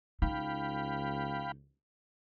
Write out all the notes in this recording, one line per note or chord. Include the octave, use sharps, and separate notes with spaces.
C#2 D#4 F5 G5 B5